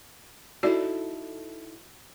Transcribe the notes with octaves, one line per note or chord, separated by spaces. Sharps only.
D#4 E4 F#4 A4 D5